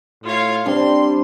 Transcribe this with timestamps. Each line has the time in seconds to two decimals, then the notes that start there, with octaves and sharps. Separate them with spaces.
0.23 A2 F4 C#5 F5
0.66 G3 C4 D4 C6